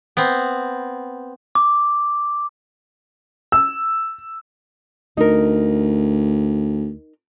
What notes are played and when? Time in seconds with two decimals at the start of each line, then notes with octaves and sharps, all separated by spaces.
0.17 B3 C4
1.55 D6
3.52 E6
5.17 D2 D#4 A#4